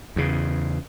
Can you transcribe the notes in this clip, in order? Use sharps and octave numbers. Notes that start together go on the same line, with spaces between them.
E2 C#3